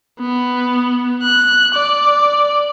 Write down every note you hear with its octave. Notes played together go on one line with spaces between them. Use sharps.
B3
F#6
D5